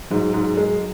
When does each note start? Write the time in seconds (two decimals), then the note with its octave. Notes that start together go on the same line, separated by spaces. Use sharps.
0.10 G#2 F#3
0.34 G#2
0.57 G#3